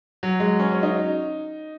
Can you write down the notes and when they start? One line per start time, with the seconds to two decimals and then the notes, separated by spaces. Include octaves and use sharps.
0.23 F#3
0.40 G#3
0.59 C#4
0.71 C#4
0.83 D#4